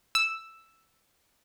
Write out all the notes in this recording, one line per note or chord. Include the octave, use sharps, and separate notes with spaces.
E6